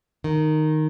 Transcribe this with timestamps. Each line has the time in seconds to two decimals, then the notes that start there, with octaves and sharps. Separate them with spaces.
0.24 D#3